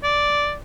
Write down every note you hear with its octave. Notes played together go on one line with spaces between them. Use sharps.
D5